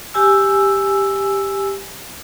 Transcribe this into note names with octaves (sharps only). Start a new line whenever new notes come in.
G4 G#5 E6